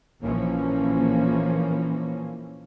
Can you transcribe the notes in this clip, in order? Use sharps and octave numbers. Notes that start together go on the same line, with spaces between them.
A#1 E3 F3 A#3 C#4